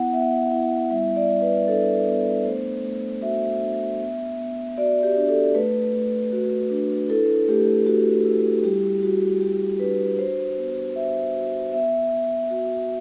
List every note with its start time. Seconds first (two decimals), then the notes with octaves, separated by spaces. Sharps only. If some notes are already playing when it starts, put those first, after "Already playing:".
Already playing: B3 E4 F#5
0.13 B3 E5
0.52 E4
0.91 G3 E5
1.16 D5
1.30 G3
1.42 B4
1.68 D4 A4
2.07 B3
2.44 A3 C5
2.83 A3
3.22 F#4 E5
3.62 D4
4.00 B3
4.38 B3
4.78 F#4 D5
5.03 G4
5.16 D4
5.29 A4
5.55 A3 B4
5.94 A3
6.32 F#4
6.70 D4
7.09 E4 A4
7.48 A3 G4
7.87 A3 F#4
8.25 E4
8.64 G3 G4
9.03 G3 F#4
9.41 F#4 G4
9.80 D4 B4
10.19 F#4 C5
10.57 B3
10.96 B3 E5
11.35 F#4
11.73 B3 E5
12.13 B3
12.50 F#4